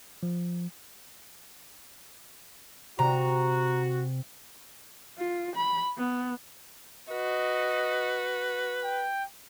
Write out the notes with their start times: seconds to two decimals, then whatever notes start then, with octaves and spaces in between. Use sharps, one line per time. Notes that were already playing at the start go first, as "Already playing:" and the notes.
0.23 F3
2.99 C3 F#4 A#5
5.18 F4
5.55 B5
5.98 B3
7.10 F#4 B4 D#5
8.84 G5